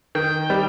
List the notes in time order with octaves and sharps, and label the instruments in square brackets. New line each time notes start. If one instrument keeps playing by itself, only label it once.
[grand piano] D#3 [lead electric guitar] G5
[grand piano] G3